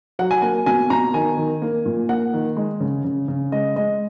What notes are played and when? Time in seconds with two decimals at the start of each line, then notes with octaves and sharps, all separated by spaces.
0.19 F#3 F#5
0.31 G#5
0.42 A#3 G#5
0.66 B2 G#5
0.90 B2 A#5
1.14 D#3 G#5
1.37 D#3
1.62 A#3
1.86 A#2
2.09 A#3 F#5
2.34 D#3
2.57 G#3
2.80 C#3
3.04 C#3
3.28 C#3
3.52 G#3 D#5
3.76 G#3 D#5